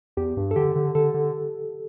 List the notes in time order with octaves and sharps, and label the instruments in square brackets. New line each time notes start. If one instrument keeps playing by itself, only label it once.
[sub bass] E2 [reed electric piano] G4
[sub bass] G2
[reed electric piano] A4
[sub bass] D3 [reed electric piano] G4
[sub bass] D3
[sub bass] D3 [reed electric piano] A4
[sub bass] D3